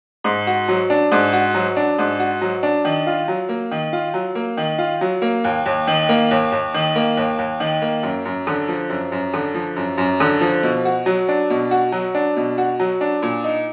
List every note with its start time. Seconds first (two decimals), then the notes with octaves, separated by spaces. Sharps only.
0.24 G#2
0.47 F#4
0.68 F#3
0.90 D4
1.12 G#2
1.33 F#4
1.55 F#3
1.76 D4
1.98 G#2
2.19 F#4
2.41 F#3
2.63 D4
2.85 D#3
3.06 F4
3.28 F#3
3.49 A#3
3.71 D#3
3.93 F4
4.14 F#3
4.35 A#3
4.57 D#3
4.78 F4
5.01 F#3
5.22 A#3
5.44 D#2
5.66 D#2
5.87 D#3
6.09 A#3
6.31 D#2
6.52 D#2
6.74 D#3
6.96 A#3
7.17 D#2
7.38 D#2
7.60 D#3
7.82 A#3
8.03 F#2
8.25 F#2
8.47 D3
8.69 F3
8.90 F#2
9.12 F#2
9.34 D3
9.54 F3
9.76 F#2
9.98 F#2
10.20 D3
10.41 F3
10.63 B2
10.85 F#4
11.06 F#3
11.28 D4
11.50 B2
11.71 F#4
11.92 F#3
12.15 D4
12.36 B2
12.58 F#4
12.80 F#3
13.01 D4
13.22 A#2
13.44 D#4